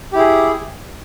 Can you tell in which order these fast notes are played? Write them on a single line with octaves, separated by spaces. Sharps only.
G4 E4 G#4